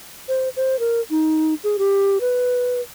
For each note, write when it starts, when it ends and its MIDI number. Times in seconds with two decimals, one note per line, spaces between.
0.28 0.49 72
0.56 0.79 72
0.79 1.00 70
1.10 1.54 63
1.64 1.77 68
1.79 2.18 67
2.21 2.81 71